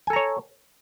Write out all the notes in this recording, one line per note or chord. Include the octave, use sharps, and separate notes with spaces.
A4 C#5 G#5 A#5